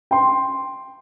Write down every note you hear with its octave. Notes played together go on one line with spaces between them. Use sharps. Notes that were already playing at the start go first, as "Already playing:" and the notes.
G5 C6